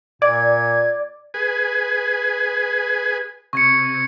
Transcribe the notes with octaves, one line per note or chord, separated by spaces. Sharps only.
A#2 D5 G#6
G#4 B4 G#5
C3 C#6 G#6 C#7